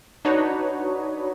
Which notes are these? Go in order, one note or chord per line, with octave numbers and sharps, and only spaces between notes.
D4 D#4 F#4 B4 C#5